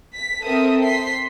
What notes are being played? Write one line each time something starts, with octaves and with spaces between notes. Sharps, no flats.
B6
C4 A4 A#4 E5 D#6
C6 B6 C7